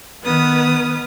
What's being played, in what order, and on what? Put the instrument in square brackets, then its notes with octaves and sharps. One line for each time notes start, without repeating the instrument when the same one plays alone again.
[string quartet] D#3 B3 B4 D#6 F6